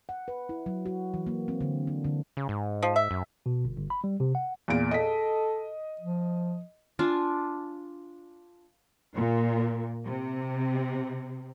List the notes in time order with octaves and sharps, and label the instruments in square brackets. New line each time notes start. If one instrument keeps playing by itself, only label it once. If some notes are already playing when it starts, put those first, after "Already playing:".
[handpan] F#5
B4
E4
F#3
F#4
E3
A#3
C4
D3
D4
D3
[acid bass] C#3
G#2
[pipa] F3
E5
[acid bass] F#2
[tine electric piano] B2
G1
G1
B5
G3
C3
F#5
[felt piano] E2 A#2 D7
[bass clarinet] A4 [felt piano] D#5 B6
[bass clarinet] F3
[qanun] D4 F4 D5 G#5
[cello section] A#2
C3